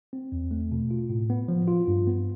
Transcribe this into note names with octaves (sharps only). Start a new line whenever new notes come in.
C4
E2
A3
B2
F4
A2
B3
F3
F4
G2
B3